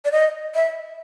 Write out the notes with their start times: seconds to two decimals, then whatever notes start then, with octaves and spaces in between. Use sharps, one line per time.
0.05 D5
0.12 D#5
0.55 E5